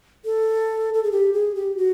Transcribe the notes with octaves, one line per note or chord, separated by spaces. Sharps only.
A4
A4
G#4
G4
G#4
G4
F#4